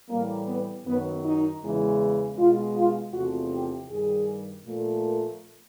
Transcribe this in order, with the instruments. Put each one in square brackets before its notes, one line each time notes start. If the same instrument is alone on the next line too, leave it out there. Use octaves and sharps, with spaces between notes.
[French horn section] A2 E3 G3 A#3
B3
F#2 D#3 F#3 B3
D#4
E2 C#3 E3 G#3
B2 G#3 F4
F4
E2 C3 F3 A3 F#4
G4
G2 D#3 G3 G#4
A#2 F3 A3
A#4